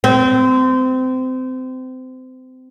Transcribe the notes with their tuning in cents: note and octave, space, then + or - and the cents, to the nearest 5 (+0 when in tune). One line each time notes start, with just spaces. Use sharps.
C4 -25